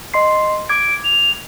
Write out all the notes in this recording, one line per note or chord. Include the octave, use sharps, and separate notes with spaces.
D#5 C6 C7
D6 G#6 D7
F7